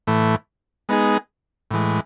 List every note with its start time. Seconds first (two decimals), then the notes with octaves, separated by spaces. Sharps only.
0.07 A2 E3 A3
0.89 G#3 B3 D#4 G#4
1.71 A2 E3 G#3